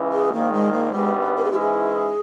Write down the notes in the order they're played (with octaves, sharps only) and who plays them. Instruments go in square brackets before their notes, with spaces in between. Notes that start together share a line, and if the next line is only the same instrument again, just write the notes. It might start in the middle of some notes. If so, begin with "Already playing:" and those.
Already playing: [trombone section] C#2 C#3 E3
[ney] G#4
[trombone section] A#1 G#2 D#3 [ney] A#3
[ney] G#3
A#3
[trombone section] G#1 G2 G3 B3 [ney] G#3
[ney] A#4
G#4
[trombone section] G#2 E3 G#3 C#4 E4 [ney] G4
[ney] G#4